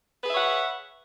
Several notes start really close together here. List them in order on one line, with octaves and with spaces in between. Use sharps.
B4 G#4 E5 C#5 F#5